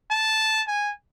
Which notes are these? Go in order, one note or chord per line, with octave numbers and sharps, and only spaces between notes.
A5
G#5